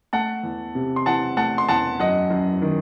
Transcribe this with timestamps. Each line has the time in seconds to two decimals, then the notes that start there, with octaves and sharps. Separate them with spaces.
0.13 A3 F#5 A5
0.43 E2
0.75 C3
0.96 C6
1.06 E3 F#5 A5
1.37 A3 F#5 A5
1.58 C6
1.69 E2 F#5 A5
2.00 F#2 D#5 F#5
2.30 F#2
2.62 D#3